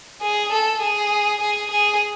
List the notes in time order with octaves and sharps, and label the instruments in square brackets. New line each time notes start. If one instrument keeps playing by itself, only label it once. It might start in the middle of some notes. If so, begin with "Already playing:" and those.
[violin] G#4
A4
G#4
G#4
G#4